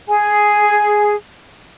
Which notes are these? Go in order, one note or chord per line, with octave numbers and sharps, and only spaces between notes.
G#4 G#5